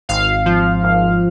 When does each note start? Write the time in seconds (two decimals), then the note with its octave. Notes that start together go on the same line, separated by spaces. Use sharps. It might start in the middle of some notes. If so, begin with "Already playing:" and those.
0.09 G#1 F5
0.46 F3
0.83 G#1